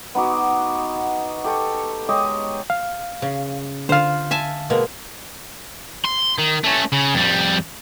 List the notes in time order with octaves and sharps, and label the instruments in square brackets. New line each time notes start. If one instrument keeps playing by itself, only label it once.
[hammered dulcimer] B3 D#4 F#4 D6
G4 A4 G5 C#6
G#3 G4 C#5 D#5
[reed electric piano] F5
[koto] C#3
[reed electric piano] D3 F5 [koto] F4 C5
[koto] E5 G#5 A5
B2 G#3 A#3
[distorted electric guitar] C6
D#3
A3 C#4
C#3
F2 G3